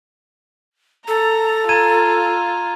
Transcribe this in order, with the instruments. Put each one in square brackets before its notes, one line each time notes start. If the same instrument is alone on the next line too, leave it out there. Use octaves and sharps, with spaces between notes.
[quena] A4 [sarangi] A#5
[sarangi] F4 [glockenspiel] A#5 G#6 D#7